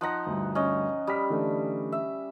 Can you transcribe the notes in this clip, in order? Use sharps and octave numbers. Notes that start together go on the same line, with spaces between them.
F3 D#4 F#5 F#6 A#6
D2 G2
C#4 D#5
G3 D#6 F6 B6
D3 E3 A3
E5